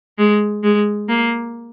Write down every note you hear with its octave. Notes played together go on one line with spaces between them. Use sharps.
G#3
G#3
A#3